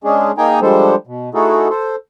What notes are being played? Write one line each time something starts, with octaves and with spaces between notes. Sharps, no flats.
G#3 C#4 D4 G#4
A#3 D#4 G#4 G5 G#5 A#5
F3 G3 G#3 D4 A4 C5
B2
A3 D#4 E4 F#4 G#4 A4
A4 C5